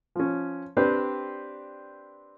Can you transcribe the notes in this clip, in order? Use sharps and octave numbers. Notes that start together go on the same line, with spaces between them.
F3 C#4
C4 D4 G4 B4 C5